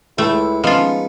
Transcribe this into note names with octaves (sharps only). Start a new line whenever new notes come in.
C#2 A3 E4 G5
F3 G#3 B3 C#4 D#4 F4